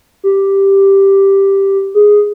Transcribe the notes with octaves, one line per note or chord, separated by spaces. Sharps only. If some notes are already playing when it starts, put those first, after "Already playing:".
G4
G#4